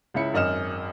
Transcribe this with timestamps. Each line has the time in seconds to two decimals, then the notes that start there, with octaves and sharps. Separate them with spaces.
0.14 C#2 C#3 E4 C#7
0.33 G#1 F#2 D#5 F6 E7